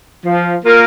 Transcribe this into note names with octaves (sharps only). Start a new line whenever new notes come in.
F3
A#3 F4 A#4